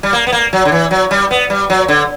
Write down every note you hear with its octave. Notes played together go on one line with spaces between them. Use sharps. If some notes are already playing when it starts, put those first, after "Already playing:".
G3
A#3
B3
A#3
F#3
D3
E3
F#3
G3
B3
G3
F#3
D3